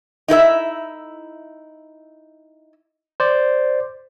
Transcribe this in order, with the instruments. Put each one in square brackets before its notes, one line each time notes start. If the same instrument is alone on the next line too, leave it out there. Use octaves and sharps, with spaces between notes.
[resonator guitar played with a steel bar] D#4 E4 A#4 E5
[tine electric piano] C5 D5